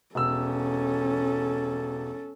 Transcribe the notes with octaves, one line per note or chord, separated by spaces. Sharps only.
E1 C#4 A4 E6